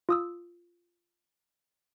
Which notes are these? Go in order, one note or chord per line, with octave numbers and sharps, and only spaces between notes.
F4 D#6 E6